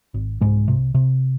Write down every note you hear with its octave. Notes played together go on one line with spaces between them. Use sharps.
G#1
C2 G#2 G#3
C3
C3